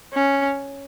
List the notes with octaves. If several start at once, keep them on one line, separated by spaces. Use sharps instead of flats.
C#4